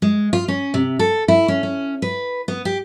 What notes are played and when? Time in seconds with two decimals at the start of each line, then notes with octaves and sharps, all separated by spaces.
0.02 G#3
0.33 F4
0.48 C#4
0.74 C3
0.99 A4
1.28 E4
1.48 C#4
1.63 C#4
2.02 B4
2.48 B3
2.65 G4